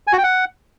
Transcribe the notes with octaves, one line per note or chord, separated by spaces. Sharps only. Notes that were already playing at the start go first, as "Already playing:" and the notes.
G#5
F#4
G5
F#5